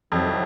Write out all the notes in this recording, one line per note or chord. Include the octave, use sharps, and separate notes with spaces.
C2 F2 C3 D#3 F#3